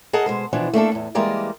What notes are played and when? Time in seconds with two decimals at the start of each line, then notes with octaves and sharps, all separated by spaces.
0.13 G#4 A#4 D#5 F#5 A5 A#5
0.26 B2 G#3 C5
0.53 B2 E3 F3 D4
0.73 A3 A#3 D4 A4
0.92 E2 A2
1.15 E3 G3 G#3 A#3 A#4 D5